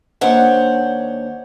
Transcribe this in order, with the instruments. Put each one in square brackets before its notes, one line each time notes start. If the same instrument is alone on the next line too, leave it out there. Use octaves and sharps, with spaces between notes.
[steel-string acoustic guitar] D#2 D4 C5 C#5 F#5